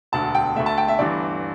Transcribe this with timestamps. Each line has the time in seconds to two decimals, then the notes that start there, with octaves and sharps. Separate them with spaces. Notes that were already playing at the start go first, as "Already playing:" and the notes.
0.12 E1 D2 D3 A5
0.35 G5
0.56 D2 D3 A3 E5
0.66 A5
0.78 G5
0.88 E5
0.98 G1 G2 E3 D5